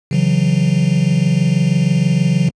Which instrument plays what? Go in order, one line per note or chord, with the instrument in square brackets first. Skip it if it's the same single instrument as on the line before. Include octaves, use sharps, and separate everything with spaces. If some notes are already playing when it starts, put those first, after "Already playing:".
[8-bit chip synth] C#3 E3 F#3